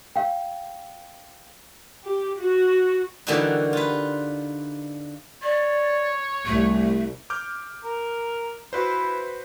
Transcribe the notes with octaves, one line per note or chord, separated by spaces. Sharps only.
F5 G5
G4
F#4
D3 E3 G3 A#3 D#4 F#4
F4 B4
C#5 D5
C2 A3
D6 F6 G6
A#4
E4 F#4 B4 C5